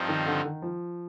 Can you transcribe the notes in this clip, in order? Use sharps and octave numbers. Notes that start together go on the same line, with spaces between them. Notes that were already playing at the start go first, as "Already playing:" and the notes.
Already playing: G2 F3 C4 D#4
D#3
D3
D#3
F3